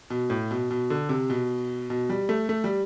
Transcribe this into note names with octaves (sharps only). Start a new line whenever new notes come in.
B2
A2
B2
B2
D3
C3
B2
B2
G3
A3
A3
G3